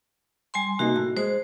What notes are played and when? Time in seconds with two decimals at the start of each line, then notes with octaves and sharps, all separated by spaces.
0.54 G3 G#5 C6
0.79 C3 A#3 D#4 F#4
0.96 A2
1.17 G#3 C5